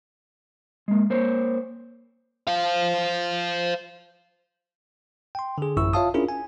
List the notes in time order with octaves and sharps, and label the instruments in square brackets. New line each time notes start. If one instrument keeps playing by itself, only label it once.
[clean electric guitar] G#3 A#3
A#3 C5 C#5
[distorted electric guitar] C5 F5
[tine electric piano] G5 C6
D3 G#4
A1 F#2 E4 C#6 E6
F4 C#5 E5 F5 A5 D#6
C#4 D4 E4 F4 G#4 A#4
G#5